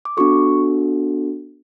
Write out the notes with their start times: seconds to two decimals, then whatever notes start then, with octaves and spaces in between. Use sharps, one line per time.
0.05 D6
0.17 B3 D4 F#4 A4 C#6